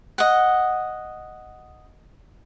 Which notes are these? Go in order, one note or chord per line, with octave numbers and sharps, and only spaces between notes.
D#5 F#5